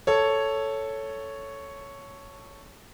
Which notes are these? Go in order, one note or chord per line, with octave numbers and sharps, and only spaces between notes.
A4 C#5